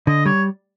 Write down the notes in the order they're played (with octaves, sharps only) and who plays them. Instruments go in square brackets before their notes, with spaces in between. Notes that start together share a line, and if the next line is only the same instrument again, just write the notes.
[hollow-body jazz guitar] D3 [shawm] D#5
[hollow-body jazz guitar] G3 [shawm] C#5